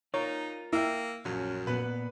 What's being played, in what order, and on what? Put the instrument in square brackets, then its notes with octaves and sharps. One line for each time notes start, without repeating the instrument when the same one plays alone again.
[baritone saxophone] D#4 [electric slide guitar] F4 A#4 [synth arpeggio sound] C#5
[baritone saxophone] A#3 [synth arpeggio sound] E4 E5 [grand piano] G5 E6
[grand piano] A#1 [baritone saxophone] F#2 [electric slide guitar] C#4
[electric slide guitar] A#2 B3 [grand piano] B4